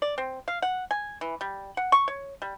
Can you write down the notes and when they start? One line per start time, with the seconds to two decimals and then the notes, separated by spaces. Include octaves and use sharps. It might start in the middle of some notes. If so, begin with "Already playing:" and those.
0.02 D5
0.18 C4
0.48 F5
0.62 F#5
0.91 G#5
1.21 E3
1.41 G3
1.77 F#5
1.92 C#6
2.08 C#5
2.42 G3